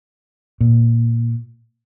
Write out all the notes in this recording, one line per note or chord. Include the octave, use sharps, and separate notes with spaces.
A#2